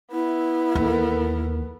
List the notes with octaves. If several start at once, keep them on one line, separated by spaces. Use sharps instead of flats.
B3 E4
D#2 E3 A4 A#4